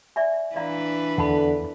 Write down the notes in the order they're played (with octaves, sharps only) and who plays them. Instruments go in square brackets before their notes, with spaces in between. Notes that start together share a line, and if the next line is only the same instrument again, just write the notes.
[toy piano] D5 E5 G#5
[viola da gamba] E3 D4 B4 [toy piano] D5 F5 A#5
[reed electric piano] E2 [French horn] D3 [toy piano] F#5 A5 B5